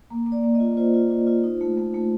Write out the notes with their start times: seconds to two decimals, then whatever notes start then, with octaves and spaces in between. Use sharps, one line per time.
0.10 A#3
0.26 A#3
0.32 D5
0.44 A#3
0.55 D#5
0.60 F4
0.77 F4 C5
0.94 F4
1.10 F4
1.27 F4
1.44 D#4
1.61 A3
1.78 A3
1.94 A3